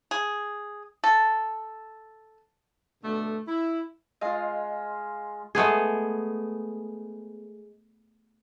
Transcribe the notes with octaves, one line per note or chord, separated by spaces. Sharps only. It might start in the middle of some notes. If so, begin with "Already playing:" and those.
G#4
A4
B2 D3 A3
E4
G#3 F4 D#5 F5
G#3 A3 B3 G#4